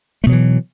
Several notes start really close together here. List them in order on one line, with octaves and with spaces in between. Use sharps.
A3 B2 F#3 E3